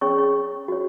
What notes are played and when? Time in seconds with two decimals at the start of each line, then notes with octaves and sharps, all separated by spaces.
0.01 C#4 G#4 C#5 C#6
0.18 C#6
0.68 F#4 C#5